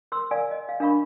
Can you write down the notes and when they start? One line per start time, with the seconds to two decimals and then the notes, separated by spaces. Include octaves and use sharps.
0.12 A#4 C6 E6
0.31 A#4 D5 F5 G#5
0.51 D#5
0.69 F5
0.80 D4 A#4 F5 B5 C#6